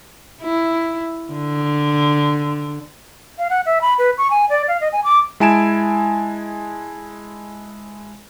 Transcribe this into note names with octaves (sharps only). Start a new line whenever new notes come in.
E4
D3
F5
F#5
E5
B5
B4
C#6
G#5
D5
F5
D#5
G#5
D6
G#3 E4 G#5 A5 D7 E7